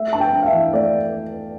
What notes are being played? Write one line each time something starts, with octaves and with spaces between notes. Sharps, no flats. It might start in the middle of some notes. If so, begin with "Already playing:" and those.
Already playing: A3 E5
G2 A5
G5
G2
F5
E5
E3
A3 D5